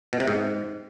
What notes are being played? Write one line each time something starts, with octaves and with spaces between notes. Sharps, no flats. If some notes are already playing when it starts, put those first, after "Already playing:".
B2
C3
G#2